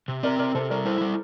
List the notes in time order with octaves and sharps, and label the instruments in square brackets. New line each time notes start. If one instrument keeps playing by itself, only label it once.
[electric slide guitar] C3
[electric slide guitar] C4 [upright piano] A#4 D5
[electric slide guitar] C3 [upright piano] A#4 D5
[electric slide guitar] C3 [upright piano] A4 C5
[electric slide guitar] G3 [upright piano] A#4 D5
[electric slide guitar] E4 [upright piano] A4 C5
[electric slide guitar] G3